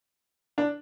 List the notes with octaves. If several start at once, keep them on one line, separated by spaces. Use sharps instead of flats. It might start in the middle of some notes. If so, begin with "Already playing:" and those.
D4